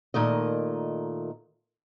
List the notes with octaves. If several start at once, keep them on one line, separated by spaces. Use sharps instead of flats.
A#2 D#3 A3 D#5